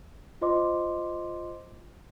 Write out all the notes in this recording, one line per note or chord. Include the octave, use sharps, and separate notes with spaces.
F4 C5 D#5 C6 D6